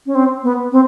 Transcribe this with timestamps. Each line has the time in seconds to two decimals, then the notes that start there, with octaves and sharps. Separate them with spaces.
0.06 C#4
0.15 C4
0.43 B3
0.72 C4